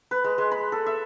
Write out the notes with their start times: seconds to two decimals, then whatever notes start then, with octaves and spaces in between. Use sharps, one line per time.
0.11 B4
0.24 G#3
0.38 G#3
0.52 B5
0.72 A4
0.86 E5